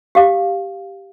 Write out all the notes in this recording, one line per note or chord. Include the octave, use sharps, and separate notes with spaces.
G4 F5 D6